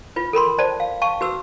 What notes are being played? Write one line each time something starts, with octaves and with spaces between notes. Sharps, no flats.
F4 B4
A4 A#4 B5 C6
C5 D5 A5
F5
F5 A5 C#6
F#4 B4 E6